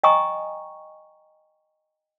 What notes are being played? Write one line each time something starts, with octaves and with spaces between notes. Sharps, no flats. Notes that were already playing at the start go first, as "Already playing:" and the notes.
D#5 G5 G#5 A#5 C#6 D#6